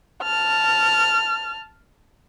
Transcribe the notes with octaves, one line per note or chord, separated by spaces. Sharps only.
A5 F6